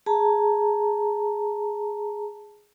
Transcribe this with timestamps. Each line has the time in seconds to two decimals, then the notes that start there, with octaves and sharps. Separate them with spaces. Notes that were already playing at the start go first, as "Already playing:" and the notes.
0.06 G#4 A5 A#5